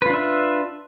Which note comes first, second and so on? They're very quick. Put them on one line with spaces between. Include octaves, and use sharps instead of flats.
B4 F4 D4 E5